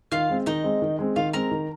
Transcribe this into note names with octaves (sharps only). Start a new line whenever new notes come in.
D#3 F4 F5
G#3 C4
D#3 D#4 D#5
G#3 C4
D#3
G#3 C4
D#3 F4 F5
G#3 C4 A#4 A#5
D#3